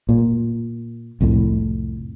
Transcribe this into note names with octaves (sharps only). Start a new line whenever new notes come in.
A#2
C2 F2 A2